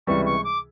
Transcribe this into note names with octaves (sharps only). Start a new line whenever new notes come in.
C#2 C3 E3 G3 C#6
C#6
D6